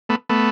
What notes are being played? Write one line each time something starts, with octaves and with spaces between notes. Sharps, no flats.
A3 B3
A3 B3